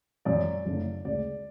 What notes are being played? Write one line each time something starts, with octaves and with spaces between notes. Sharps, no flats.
G#1 F#2 E3 D5
F#1 F#2 D3 A3
D2 C#3 G#3 D5